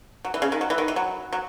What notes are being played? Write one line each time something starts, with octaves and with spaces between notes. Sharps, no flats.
F#3
E3
C#3
D#3
F#3
E3
D#3
E3
F#3
F#3